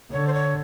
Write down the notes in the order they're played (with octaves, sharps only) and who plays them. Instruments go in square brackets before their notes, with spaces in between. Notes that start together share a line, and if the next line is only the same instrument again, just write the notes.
[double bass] D3 [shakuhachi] C#5
[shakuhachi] C5
C#5